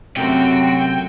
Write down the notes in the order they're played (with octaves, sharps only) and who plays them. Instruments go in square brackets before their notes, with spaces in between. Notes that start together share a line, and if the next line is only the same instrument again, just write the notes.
[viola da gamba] F#2 C4 F#4 [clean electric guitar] C3 A3 A#4 [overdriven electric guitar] G5